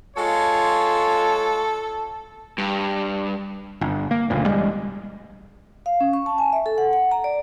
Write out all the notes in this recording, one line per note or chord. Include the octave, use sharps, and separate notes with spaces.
G#3 F4 A4 C#5
G2
G1
A#3
F#1 D2 A#2
E1 F#2 G3 G#3
F5
C#4
C#6
A5
G#5
E5
A4
F#5
F#5
A#5
D5